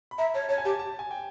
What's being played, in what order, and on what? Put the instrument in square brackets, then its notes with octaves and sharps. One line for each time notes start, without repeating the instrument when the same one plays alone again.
[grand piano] B5
[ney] E5 [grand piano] A#5
[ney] C#5 [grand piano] A5
[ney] C#5 [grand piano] A5
[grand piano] G#5
[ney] G4 [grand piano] A5
[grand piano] A5
G#5
G5